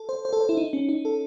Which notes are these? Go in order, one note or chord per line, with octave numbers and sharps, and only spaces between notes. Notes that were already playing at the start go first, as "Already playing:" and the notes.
Already playing: A4
C5
C5
A4
C5
E4
D#4
C#4
D#4
A4